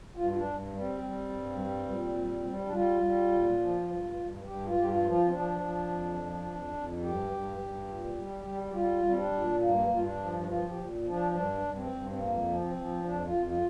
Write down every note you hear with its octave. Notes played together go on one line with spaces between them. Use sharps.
G2 F4
F4
D4
G2
G3
C4
G3
G2
G3
A#2
G3
G3
D4
G3 F4
G3
A#2
F3
G2
G2
G2 G4
F4
G2 G4
F4
F3
F4
C4
F3 D4
F3
F2
F3
F2
F2
G2 G4
G2
G2
A#2
G3
G3
G4
G3 F4
G3
C4
D4
A#2
G2 A#3
G2
F4
D4
F3
D4
F3 F4
G4
A#2
F3
D4
G2 D4
G2
C4
G2
C4
F2 A#3
F3
C4
F3
F2 D4
F4
F2
F4